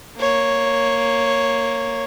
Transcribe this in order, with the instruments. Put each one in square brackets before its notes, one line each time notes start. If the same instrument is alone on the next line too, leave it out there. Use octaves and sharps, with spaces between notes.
[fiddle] A#3 C#5